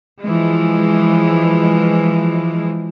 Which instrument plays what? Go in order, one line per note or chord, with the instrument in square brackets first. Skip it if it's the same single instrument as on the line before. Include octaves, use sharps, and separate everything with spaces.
[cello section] E3 F3 G#3